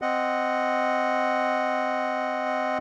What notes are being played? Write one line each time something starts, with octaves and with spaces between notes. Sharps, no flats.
C4 D#5 F#5